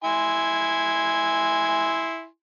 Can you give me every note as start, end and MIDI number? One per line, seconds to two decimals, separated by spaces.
0.04 2.26 64
0.04 2.26 80
0.04 2.26 84